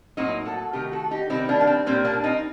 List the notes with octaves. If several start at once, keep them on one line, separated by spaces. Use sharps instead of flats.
A2 F#3 A#3 C4 D#4
F#4 A4
C3 D#3 A3 G4 A#4
F#4 A4
D#4 G4
C3 D#3 G3 C4 D#4
A#3 D4
A#3
C4
A#2 G3 A#3 C4
A#3 D4
C4 D#4